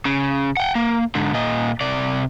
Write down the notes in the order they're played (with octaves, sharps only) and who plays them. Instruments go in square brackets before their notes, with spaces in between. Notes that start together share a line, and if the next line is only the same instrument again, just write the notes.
[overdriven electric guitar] C#3
F#5 G5
A#3
G#2 D3
A#2 D#5
C3 D5